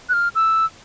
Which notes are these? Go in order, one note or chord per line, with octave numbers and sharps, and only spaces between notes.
F#6
F6
E6